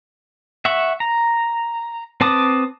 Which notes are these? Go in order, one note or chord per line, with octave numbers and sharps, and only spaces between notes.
E5 F#5 C#6
A#5
C4 B4 A5 D6 D#6